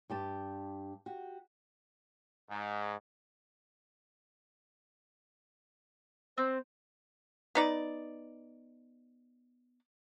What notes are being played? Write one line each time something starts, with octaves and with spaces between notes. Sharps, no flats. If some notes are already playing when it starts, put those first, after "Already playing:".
G2 G4 A5
F#4 G4
G#2
C4 C5
B3 D#4 D5